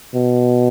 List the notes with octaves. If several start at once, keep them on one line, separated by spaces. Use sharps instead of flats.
B2